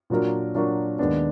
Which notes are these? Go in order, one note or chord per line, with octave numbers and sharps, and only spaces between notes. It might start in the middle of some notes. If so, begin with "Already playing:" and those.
A#2 F#3 D4 F#4 A#4
A#2 F#3 D4 F#4 A#4
D#2 D#3 G#3 B3 D4